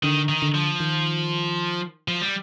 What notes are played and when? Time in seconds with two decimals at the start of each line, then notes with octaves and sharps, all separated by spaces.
0.03 D3 D#3
0.29 D#3
0.42 D3
0.54 F3
0.80 D#3
2.08 F3
2.21 G3